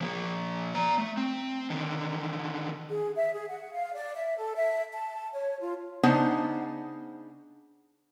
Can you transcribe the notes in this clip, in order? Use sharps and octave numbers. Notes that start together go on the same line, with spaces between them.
F3 A#3
D5 A#5
A3
C4
D3 D#3
G#4
E5
G#4
F#5
F5
D5
E5
A4
E5
A5
C#5
F4
C#3 B3 D4 D#4 C5 F#5